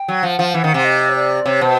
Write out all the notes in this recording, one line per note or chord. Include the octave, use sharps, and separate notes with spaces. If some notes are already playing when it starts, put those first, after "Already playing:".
Already playing: G5
F#3
F3 F#5
F3
E3
D#3
C3
D#5
C#5
D5
C3 C#5
B2 C5